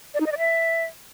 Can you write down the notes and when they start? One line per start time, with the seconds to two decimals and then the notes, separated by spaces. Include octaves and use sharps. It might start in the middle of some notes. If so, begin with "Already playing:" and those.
0.14 D5
0.20 D#4
0.26 D#5
0.32 D5
0.38 E5